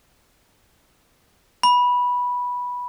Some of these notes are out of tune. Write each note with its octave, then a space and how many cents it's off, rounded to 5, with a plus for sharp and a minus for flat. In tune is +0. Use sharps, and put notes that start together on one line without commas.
B5 -10